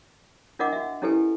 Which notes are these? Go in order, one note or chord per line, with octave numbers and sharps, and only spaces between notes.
D4 F4 A#4 D#5 F#5 D6
F#4 E5
C#4 E4 G4 A4 B4 G#5